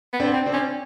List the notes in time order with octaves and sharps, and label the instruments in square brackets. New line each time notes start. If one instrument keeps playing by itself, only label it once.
[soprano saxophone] B3
[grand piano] C4 D4
[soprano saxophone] C4
[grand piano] C4 D4
[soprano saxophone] C#4